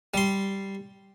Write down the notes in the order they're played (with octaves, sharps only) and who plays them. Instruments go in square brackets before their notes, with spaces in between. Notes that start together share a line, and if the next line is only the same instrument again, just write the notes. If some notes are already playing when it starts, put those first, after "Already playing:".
[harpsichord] G3 C6